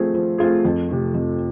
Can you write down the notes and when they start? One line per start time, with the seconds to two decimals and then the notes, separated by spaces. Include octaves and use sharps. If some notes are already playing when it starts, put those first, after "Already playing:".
Already playing: F3 A3 C4 F4 G#4
0.14 F3
0.38 A3 C4 F4 G#4
0.65 F2
0.89 C3 F3 A3
1.14 F2